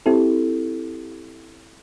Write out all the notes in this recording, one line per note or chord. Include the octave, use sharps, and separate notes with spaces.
C4 E4 G4 A4